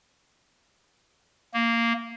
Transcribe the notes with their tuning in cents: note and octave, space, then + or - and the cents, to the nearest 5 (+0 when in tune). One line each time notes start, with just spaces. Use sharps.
A#3 -10